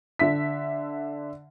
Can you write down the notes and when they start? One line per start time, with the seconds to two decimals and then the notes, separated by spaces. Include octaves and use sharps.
0.19 D3 E5 B6